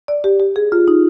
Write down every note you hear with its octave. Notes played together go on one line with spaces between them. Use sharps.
D5
G4
G4
G#4
F4
D#4